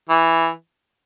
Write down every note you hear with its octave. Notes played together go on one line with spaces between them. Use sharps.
E3